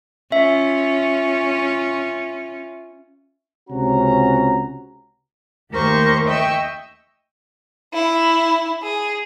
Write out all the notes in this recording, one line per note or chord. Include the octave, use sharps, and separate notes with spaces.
C#4 F4 E5
C#2 C3 C#4 F#4 A#5
D#2 A3 G4 A#4 C5 C#6
D#5 E5 G5 C#6 E6
E4
G#4